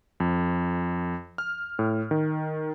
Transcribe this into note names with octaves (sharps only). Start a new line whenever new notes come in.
F2
F6
A2
D#3